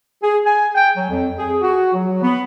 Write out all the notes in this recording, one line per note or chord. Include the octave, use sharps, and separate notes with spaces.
G#4
G#5
G5
F#3
F2
G#4
F#4
F#3
B3